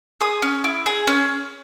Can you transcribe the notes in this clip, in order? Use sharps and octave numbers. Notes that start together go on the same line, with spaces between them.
G#4 D#6
C#4
E4
G#4
C#4